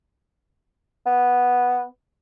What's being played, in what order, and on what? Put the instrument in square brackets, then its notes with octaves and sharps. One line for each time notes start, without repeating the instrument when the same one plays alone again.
[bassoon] B3